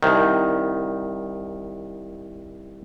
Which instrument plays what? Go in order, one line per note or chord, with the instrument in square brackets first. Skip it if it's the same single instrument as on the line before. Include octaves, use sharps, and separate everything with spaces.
[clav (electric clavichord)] C2 D#3